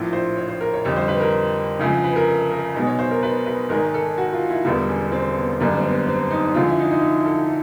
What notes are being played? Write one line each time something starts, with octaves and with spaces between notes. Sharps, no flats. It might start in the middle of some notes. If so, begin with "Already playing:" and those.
Already playing: A#1 A2 F3
C5
C#5
C5
A#4
C#5
F2 D3 G3 C#5
C5
B4
A#4
D2 C#3 F3 G#3
B4
A#4
A4
A#4
B1 B2 G#3
C#5
C5
A#4
B4
B4
G#1 G#2 D#3 G#3 A#4
A4
F#4
F4
E4
E1 D2 D3 G3 B3
C#4
C4
B3
G1 F#2 D3 G3 A#3
C4
B3
C4
D#4
D2 D3 F3 G#3 F4
E4
D#4
D#4
E4
A4